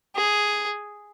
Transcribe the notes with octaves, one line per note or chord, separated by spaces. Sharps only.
G#4